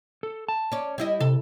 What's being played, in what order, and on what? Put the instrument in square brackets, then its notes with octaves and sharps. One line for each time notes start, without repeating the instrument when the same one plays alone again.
[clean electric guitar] A4
A5
[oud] C#4 D5
G3 E4 D#5
[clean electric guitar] C3 [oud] A4